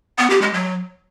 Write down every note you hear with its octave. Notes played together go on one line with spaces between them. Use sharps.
B3
G4
G#3
F#3